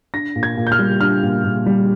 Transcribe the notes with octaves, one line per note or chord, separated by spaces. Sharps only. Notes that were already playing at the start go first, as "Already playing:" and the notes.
D4 A#6
A#2
G#6
A#2
G6
F6
G3
D4 F6
A#2
A#2
G3